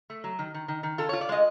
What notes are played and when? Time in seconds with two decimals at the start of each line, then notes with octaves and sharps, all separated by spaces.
0.10 A3
0.24 F#3
0.39 D#3
0.54 D#3
0.68 D#3
0.83 D#3
0.98 F4 A4
1.09 F4 C#5
1.21 D5
1.29 G#3 D#5